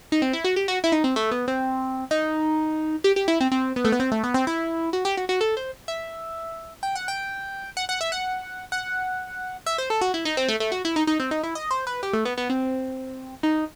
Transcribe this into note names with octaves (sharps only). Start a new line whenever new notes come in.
D#4
C4
E4
F#4
G4
F#4
E4
D#4
C4
A3
B3
C4
D#4
G4
G4
E4
C4
C4
B3
A3
B3
C4
A3
B3
C4
E4
F#4
G4
F#4
F#4
A4
C5
E5
G5
F#5
G5
F#5
F#5
E5
F#5
F#5
E5
C5
A4
F#4
E4
D#4
C4
A3
A3
F#4
E4
D#4
D#4
C4
D#4
E4
D#5
C5
B4
G4
A3
B3
B3
C4
D#4